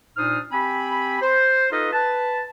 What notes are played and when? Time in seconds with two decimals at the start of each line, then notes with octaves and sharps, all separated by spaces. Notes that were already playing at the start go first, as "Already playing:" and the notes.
0.17 A#2 D4 D#4 C5 D#6 F6
0.52 C4 G4 G#5 B5
1.22 C5
1.71 D#4 F4 A4 B4 D#5 F5
1.93 B4 A5